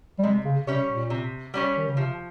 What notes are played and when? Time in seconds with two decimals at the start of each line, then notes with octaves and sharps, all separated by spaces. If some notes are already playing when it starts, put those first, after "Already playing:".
0.19 G3
0.24 C3 G#3
0.45 C#3
0.67 C3 G3 C#4 G4 C#5
0.88 A#2
1.10 C3
1.54 G3 C#4 G4 C#5
1.77 D#3
1.87 C#3
1.97 C3 F3